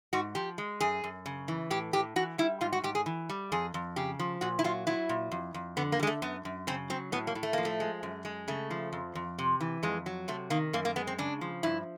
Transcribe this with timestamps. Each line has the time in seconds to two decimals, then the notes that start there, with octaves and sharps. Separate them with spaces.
0.13 G#2 F#4
0.35 F3 G4
0.58 G#3
0.80 F#2 G#4
1.04 F#2
1.26 C#3
1.48 E3
1.70 A2 G4
1.93 A2 G4
2.16 E3 F#4
2.38 G3 E4
2.61 G#2 F4
2.73 F#4
2.84 G#2 G4
2.95 G#4
3.06 E3
3.29 G3
3.52 F2 G#4
3.74 F2
3.96 C#3 G4
4.19 F3
4.41 A#2 F#4
4.59 E4
4.64 F#3 F4
4.87 F#3 E4
5.09 A#2
5.31 F2
5.54 F2
5.77 D3 B3
5.92 A#3
5.99 G3
6.03 G#3
6.07 A3
6.22 F#2 B3
6.45 F#2
6.67 C#3 C4
6.90 F#3 C4
7.12 A2 B3
7.27 A#3
7.35 A2
7.43 A3
7.53 F3 A#3
7.65 A3
7.80 G#3
8.03 F#2
8.25 G#3
8.48 C#3 A3
8.70 F3
8.93 F2
9.15 F2
9.39 C3
9.60 E3
9.83 F2 G#3
10.06 F#3
10.28 C3 A3
10.50 D#3 A#3
10.73 F#2 A#3
10.85 A#3
10.96 G#3 B3
11.07 C4
11.18 C#3 D4
11.41 F3
11.63 G2 E4